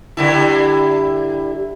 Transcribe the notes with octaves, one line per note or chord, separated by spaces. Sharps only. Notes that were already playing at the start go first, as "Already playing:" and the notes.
D3 G3 E4